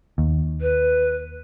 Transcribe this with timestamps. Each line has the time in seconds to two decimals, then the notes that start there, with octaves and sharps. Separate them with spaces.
0.18 D#2
0.61 B4